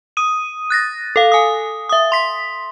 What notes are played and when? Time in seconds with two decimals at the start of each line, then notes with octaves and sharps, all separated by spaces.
0.17 D#6 D#7
0.70 F#6 A6 A#6
1.16 A4 F5
1.32 G#5 D#6
1.89 E5 D#6
2.12 C6 B6